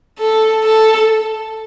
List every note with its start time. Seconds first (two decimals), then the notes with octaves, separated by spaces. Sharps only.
0.19 A4
0.65 A4